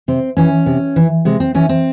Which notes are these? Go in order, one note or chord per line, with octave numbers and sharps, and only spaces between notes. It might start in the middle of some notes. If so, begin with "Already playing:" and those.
C3 C4
E3 C#4
C3
E3
C3 G#3
C4
E3 C#4
C4